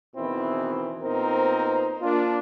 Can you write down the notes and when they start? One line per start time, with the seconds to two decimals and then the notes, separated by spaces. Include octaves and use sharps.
0.16 E2 B2 D#3 E3 C4 E4
1.02 A#2 B3 C4 D#4 A#4 C5
2.01 A#3 D4 F4